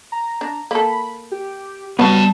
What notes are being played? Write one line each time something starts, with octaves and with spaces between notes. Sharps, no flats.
A#5
D4
A#3 A4 B5
G4
F#3 G3 B3 F#4 B4 A5